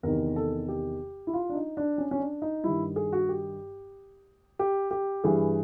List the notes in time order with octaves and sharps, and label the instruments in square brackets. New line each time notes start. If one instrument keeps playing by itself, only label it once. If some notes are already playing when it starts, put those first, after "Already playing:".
[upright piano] E2 C3 D#3 A#4
A4
G4
E4
F4
D4
D#4
D4
C#4
C#4
D4
D#4
G2 D#3 E4
G#4
F#4
G4
G4
G4
G2 E3 G#4